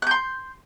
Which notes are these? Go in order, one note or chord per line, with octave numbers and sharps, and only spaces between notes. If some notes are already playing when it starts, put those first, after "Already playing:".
C6 F#6 G6